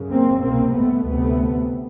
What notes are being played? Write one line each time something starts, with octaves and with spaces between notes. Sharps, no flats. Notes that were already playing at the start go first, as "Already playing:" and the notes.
Already playing: F#2 C#3
A#3 C4
C2 B2 A#3 C4
A3 B3
D2 C3 A3 B3